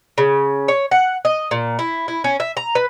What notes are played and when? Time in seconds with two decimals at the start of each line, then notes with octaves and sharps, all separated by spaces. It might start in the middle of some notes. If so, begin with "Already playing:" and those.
0.18 C#3
0.68 C#5
0.91 F#5
1.25 D#5
1.51 A#2
1.79 E4
2.08 E4
2.24 C#4
2.40 E5
2.57 A#5
2.75 B4